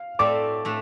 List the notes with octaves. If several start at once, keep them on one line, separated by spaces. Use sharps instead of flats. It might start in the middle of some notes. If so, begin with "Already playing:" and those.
Already playing: F5
A2 A3 C4 A4 D5 D6
A2 A3 D4